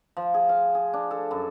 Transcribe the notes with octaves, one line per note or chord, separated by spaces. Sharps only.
F3
G#4
F5
G#4
D4
A4
F#2